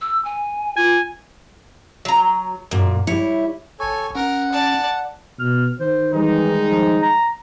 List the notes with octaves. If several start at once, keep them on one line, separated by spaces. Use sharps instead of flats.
E6
G#5
F4 G#5
F#3 A#5
F#2 A#2 A#3
G3 E4 C#5
G#1 A4 C#5 G#5 C#6
C#4 A#4 F#5
D5 A5
B2 F6
D#3 C5
E3 G3 G#3 D#4
F3
A#5